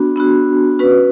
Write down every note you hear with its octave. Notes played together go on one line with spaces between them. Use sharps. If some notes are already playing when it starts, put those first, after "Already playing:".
Already playing: B3 D4 F#4
B3 D4 F#4
C#4 F#4 B4